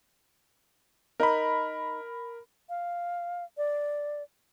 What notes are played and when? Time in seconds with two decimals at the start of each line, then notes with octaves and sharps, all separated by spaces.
1.20 D#4 A#4 D#5 B5
2.69 F5
3.57 D5